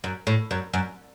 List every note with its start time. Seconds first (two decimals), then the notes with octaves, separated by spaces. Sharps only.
0.04 F#2
0.27 A2
0.51 F#2
0.74 F#2